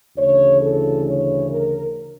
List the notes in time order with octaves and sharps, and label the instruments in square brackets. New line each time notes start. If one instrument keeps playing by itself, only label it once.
[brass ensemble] D2 C#3 E3 C#5
A4
C#5
A#4